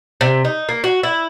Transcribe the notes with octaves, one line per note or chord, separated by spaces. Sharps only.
C3
D#4
A#3
F#4
E4